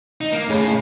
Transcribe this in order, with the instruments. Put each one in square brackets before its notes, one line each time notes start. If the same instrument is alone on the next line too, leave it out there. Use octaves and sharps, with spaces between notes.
[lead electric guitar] D#4
A#3
[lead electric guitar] A2 [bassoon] C#3